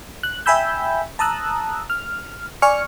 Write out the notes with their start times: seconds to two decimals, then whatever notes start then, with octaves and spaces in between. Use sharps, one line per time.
0.23 F#6
0.46 E5 G5 G#5 B5 E6 G6
1.19 A5 A#5 D#6 E6 F#6
1.90 F6
2.62 D5 G#5 C#6 F6 C#7